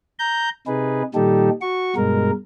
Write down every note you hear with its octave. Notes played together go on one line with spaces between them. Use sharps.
A#5 G6
C3 D#4 G#4 B4
A#2 D#3 G3 D#4 G4 A4
F#4 C#6
G2 B2 G#3 A#4